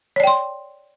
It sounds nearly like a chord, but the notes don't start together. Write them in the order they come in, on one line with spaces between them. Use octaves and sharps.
C#5 D5 G5 C6